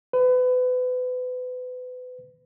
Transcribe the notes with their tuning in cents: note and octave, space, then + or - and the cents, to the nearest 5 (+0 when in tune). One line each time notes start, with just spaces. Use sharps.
B4 +30